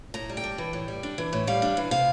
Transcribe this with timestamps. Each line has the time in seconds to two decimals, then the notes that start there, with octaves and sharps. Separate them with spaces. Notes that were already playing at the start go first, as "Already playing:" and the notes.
0.14 A2 A#5
0.30 G3
0.37 G5
0.44 D4
0.58 E3
0.73 A2
0.88 G3
1.03 D4
1.18 E3
1.33 A2
1.47 G3 F5
1.62 D4
1.77 E3
1.91 C3 F5